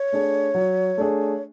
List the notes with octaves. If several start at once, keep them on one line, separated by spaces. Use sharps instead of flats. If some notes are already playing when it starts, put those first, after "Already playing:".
Already playing: C#5
A3 D4 G#4
F#3
A3 D4 G#4